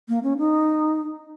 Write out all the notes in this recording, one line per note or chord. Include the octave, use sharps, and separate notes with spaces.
A#3
C#4
D#4